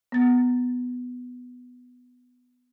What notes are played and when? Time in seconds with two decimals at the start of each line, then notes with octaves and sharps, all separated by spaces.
0.12 B3 A6